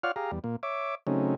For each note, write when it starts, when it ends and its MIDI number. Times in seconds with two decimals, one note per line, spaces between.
0.04 0.12 65
0.04 0.12 73
0.04 0.12 74
0.04 0.12 77
0.04 0.12 78
0.04 0.12 89
0.16 0.31 67
0.16 0.31 68
0.16 0.31 77
0.16 0.31 82
0.31 0.39 40
0.31 0.39 55
0.44 0.56 46
0.44 0.56 58
0.63 0.95 73
0.63 0.95 76
0.63 0.95 86
1.07 1.35 49
1.07 1.35 54
1.07 1.35 57
1.07 1.35 60
1.07 1.35 61
1.07 1.35 63